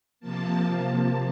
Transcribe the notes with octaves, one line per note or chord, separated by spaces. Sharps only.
C3 F3 A#3 A5